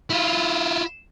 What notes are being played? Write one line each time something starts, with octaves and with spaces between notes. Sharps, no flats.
E4 F4